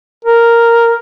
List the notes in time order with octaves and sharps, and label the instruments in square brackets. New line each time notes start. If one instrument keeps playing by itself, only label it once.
[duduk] A#4